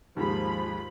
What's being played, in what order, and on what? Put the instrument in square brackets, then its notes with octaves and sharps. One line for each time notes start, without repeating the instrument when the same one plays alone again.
[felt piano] D#2 G#2 G#3 [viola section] F3 B5